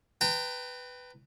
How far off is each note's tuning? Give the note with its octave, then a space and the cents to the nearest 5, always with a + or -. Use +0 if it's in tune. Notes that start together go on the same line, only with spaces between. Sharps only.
B4 +10 G5 +0 A#5 -40